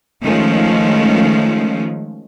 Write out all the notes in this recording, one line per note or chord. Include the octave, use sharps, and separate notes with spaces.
D#3 F3 G#3 A3 C#4